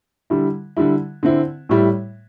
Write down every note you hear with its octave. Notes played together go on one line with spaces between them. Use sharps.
D3 G3 E4
D3 G3 E4
D3 C4 E4
A2 G3 E4